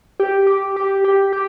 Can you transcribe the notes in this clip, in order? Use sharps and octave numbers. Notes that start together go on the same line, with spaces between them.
G4
G4
G4
G4
G4